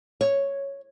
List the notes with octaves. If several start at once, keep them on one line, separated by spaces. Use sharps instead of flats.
C#5